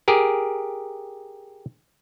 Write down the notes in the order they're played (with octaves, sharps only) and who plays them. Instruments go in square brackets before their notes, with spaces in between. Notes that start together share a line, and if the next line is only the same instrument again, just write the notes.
[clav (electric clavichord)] G4 G#4 A#4